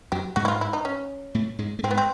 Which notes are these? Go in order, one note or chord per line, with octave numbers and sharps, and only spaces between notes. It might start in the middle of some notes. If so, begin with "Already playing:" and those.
F#2 F#3 G4
G#2 G#3 F#4
E4
F4
E4
D#4
C#4
A2 A3
G#2 G#3
A3
G#2 G#3 C4
B3
C4